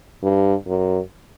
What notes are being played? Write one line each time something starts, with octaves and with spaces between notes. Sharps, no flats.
G2
F#2